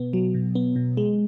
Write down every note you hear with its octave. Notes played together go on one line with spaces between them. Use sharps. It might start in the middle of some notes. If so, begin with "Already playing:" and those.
Already playing: B2 B3
F#3
B2
B3
B2
G#3